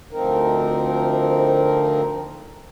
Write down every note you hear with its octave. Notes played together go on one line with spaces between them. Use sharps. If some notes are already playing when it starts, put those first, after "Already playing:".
D2 F3 C4 D#4 A#4